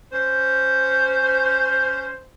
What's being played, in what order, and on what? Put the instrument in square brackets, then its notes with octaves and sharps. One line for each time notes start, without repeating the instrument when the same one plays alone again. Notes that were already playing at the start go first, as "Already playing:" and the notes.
[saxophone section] C#4 C5